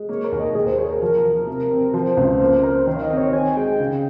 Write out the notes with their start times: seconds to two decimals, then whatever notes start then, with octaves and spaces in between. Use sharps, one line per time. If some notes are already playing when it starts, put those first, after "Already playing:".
Already playing: G#3
0.09 A#3 C#5
0.24 A#4
0.32 D#2
0.40 D#5
0.55 A#2 G#4
0.67 C5
0.78 G#4 C#5
0.90 A#4
1.01 F3 A#4
1.25 F3
1.47 C3
1.71 C4
1.94 F3 C5
2.17 C#2
2.40 A#3
2.63 A#4
2.87 D#3 C#5
2.96 F5
3.03 D#5
3.10 C4
3.17 C#5
3.33 D#4 G#5
3.56 G#3 G5
3.80 C#3